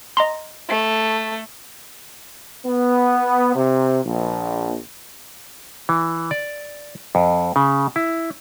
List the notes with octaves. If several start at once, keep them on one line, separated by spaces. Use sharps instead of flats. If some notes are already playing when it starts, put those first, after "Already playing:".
D#5 A#5 C6
A3
B3
C3
A#1
E3
D5
F2
C#3
E4